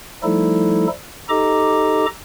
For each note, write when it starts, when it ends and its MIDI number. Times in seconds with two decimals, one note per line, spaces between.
0.23 0.87 53
0.23 0.87 55
0.23 0.87 57
0.23 0.87 63
0.23 0.87 64
0.23 0.87 69
1.29 2.06 63
1.29 2.06 67
1.29 2.06 69
1.29 2.06 75
1.29 2.06 82
1.29 2.06 86